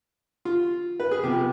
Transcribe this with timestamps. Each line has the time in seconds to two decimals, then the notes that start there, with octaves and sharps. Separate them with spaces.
0.45 F4
1.00 B4
1.11 G#4
1.23 C3 F3 B3 G4